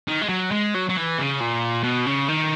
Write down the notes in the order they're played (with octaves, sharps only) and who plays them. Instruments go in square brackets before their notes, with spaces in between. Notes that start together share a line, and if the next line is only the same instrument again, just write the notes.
[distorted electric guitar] D#3
G#3
F#3
G#3
F#3
F#3
E3
C#3
A#2
B2
C#3
D#3